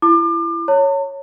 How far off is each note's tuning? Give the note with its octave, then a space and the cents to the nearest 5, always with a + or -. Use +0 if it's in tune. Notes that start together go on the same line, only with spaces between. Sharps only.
E4 +25 D6 +35
C#5 +0 A5 +45